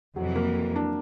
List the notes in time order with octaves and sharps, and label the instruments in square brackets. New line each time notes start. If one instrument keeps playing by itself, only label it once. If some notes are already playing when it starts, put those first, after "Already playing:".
[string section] F2 C3 E3 [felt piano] F#3
[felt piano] A#3
D4